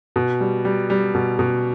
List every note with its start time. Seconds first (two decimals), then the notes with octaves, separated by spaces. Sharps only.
0.16 B2
0.41 G3
0.65 G3
0.90 G3
1.15 B2
1.39 B2